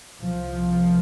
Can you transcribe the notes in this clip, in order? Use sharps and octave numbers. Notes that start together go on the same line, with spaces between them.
C2 F3